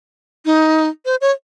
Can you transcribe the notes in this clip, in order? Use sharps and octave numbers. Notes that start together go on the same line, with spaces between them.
D#4
C5
C#5